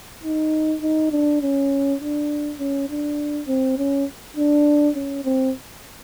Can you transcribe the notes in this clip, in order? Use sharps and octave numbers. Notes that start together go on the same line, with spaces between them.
D#4
D#4
D4
C#4
D4
C#4
D4
C4
C#4
D4
C#4
C4